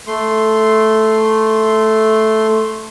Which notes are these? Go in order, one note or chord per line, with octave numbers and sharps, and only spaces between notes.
A3 C6